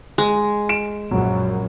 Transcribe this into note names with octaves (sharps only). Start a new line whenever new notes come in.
G#3
D7 E7
A#1 F#2 F#3